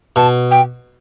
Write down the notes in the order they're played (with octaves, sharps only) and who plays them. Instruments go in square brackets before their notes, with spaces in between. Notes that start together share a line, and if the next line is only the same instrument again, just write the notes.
[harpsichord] B2 [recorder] A5
[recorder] G5